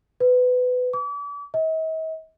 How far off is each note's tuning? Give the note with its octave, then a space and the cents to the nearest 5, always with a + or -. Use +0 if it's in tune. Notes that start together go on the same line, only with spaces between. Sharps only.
B4 +20
D6 -40
D#5 +45